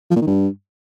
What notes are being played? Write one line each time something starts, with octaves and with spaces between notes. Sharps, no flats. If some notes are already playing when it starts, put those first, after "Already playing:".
F3
A#2
D#3
G2